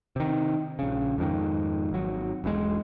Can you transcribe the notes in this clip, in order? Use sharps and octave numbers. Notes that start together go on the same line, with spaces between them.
C3 D#3
A#1 C#3
F2 G#2 D#3
G#1 F#3
E1 B1 B2 G#3